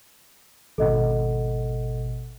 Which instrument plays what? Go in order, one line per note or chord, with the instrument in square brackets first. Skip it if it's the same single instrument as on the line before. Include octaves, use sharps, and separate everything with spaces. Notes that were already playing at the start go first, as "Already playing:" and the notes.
[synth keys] G#1 B2 [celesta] A4 D#5 F#5